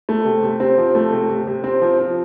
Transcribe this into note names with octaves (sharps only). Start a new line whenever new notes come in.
A3
C3
C3
C4
F3
A3
C3
C3
C3
C4
F3
F3